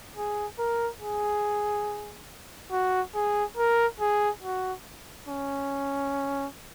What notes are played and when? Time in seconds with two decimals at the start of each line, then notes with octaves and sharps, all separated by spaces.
0.17 G#4
0.59 A#4
1.01 G#4
2.71 F#4
3.15 G#4
3.57 A#4
4.00 G#4
4.43 F#4
5.28 C#4